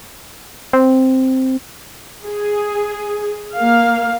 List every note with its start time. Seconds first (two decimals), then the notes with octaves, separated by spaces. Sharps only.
0.73 C4
2.23 G#4
3.56 A#3 F5